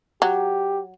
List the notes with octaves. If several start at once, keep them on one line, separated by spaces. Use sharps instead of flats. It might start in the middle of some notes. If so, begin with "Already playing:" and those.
F#3 G4